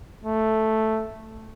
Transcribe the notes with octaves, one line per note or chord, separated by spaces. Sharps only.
A3